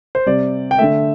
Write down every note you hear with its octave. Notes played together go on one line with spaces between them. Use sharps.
C5
C3 G3 D5
G5
D3 A3 E5